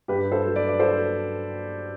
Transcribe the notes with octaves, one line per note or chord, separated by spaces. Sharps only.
G2 G4 B4
A4 C5
F#3
B4 D5
D5
A4 C5